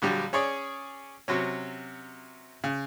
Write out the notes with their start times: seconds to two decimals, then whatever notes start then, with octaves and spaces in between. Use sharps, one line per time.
0.02 A#1 D3 F#3 G3 G4
0.33 C#4 G#4 C#5 D5
1.28 C3 F#3 C#4
2.64 C#3